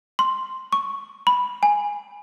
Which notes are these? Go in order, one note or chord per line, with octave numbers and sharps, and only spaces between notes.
C6
C#6
B5
G#5